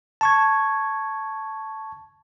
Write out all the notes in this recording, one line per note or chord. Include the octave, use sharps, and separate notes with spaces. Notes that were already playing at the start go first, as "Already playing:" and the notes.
A5 C#6 G#6